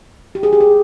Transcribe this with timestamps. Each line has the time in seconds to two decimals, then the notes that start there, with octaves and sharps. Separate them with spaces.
0.35 G4
0.43 G#4
0.53 G4
0.60 G#4